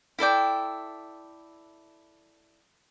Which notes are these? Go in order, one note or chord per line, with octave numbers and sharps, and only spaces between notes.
E4 A4 D5 G5